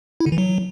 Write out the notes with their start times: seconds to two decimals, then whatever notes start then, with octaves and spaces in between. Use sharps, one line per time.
0.20 E4
0.26 D3
0.32 E3
0.38 F#3